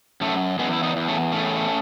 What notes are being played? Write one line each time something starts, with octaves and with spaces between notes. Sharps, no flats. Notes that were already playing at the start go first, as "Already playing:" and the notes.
F#2 A3
E2 G#3 B3
E4
B3 D#4
E2
A3 C#4
A2 A3 C#4